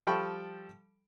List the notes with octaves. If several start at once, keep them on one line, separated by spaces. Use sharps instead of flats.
F3 G3 A4 G5 B5 C#6